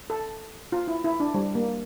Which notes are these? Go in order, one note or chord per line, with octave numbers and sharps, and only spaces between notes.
A4
F4
E4
E4
D4
G3
A#3